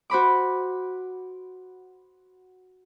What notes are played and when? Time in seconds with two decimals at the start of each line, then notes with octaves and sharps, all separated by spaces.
0.10 F#4 C5 B5 D6